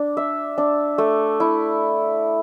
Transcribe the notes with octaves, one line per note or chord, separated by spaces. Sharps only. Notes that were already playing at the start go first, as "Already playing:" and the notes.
Already playing: D4
E5
D4
A3
E4